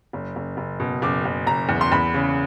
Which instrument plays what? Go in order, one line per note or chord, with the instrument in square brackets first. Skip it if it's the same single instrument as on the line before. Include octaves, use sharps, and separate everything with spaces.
[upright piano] F#1
F#1
F#1
B2
F#1 D6
F#1
F#1 A#5
E2
C6
E2 B5
C#3